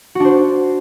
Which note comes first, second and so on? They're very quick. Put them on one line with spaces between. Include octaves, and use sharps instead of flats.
F#4 D4 C5